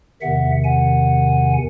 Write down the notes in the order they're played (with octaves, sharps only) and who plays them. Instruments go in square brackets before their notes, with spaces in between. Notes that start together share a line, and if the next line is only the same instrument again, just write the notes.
[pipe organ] E2 C3 D#3 E5 F#5
F#5 G#5